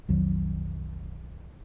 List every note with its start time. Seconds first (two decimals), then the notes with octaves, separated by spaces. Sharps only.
0.09 B1 F2 D#3 F#3